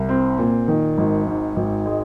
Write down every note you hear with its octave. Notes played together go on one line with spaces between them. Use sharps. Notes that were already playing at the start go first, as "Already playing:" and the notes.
Already playing: C2
C4
A#2
D#3
G#1
G#2
G#1
G#3